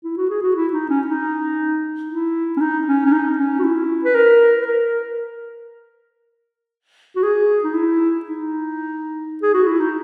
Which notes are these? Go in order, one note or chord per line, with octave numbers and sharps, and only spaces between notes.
E4
F#4
G#4
F#4
E4
D#4
C#4
D#4
E4
C#4
D#4
C#4
C#4
D#4
C#4
F#4
E4
B4
A#4
B4
A#4
F#4
G#4
D#4
E4
D#4
G#4
F#4
E4
D#4